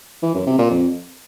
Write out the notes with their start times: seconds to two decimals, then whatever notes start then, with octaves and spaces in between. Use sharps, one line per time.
0.23 E3
0.35 F#2
0.46 C3
0.58 A#2
0.70 F2